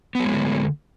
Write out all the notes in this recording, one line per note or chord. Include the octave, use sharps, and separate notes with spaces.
D3 F#3 G#3 A3 B3